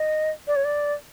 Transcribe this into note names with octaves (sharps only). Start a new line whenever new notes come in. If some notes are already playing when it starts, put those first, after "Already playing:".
Already playing: D#5
D5
C#5
D5